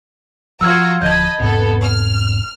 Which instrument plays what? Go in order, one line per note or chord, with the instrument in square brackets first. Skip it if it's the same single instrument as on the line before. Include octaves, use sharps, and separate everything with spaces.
[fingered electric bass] F3 [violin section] F4 F#4 A#5 [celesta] E6 F6 G#6
[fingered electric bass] D1 D3 F3 [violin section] D#5 A5 B5 [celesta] G6 G#6
[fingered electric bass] E1 G#2 C3 [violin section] B3 A4
[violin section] F6